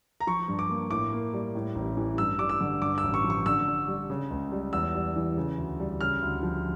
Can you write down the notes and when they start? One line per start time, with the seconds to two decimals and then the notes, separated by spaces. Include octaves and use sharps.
0.20 A#5
0.27 F3 C#6
0.48 G2
0.59 D6
0.70 A#3
0.90 A2 D6
1.12 A#3
1.33 G3
1.55 A2
1.75 A1
1.97 E3
2.18 G2 E6
2.39 G3 D6
2.49 E6
2.61 D3
2.82 G2 D6
2.98 E6
3.04 A1
3.14 C#6
3.24 F3
3.30 C#6
3.46 D3 E6
3.67 D4
3.88 G3
4.10 C#3
4.31 C#2
4.52 G3
4.73 E2 E6
4.94 G3
5.16 E3
5.37 C#3
5.58 D2
5.80 G3
6.01 C#3 F6
6.22 D2
6.43 F3